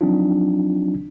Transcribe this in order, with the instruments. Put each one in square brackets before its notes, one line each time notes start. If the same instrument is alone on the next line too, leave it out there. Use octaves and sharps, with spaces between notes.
[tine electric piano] F3 F#3 C4 D4 D#4 F4